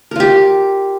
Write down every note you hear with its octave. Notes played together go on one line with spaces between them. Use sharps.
F4 G4 A#4